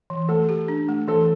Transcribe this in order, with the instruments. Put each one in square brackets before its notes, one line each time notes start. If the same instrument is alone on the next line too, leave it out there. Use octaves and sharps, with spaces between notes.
[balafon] E3
[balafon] A3 [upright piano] A4
[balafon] G4
D4
A3
[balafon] E3 [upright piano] A4